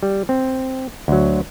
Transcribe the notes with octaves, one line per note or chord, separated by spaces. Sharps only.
G3
C4
D2 F#3